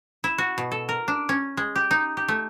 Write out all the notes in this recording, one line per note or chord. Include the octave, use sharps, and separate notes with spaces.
E4
F#4
B2
A4
A#4
D4
C#4
G#3
G4
D#4
G4
A3